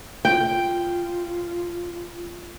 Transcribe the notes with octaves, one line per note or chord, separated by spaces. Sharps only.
F4 G5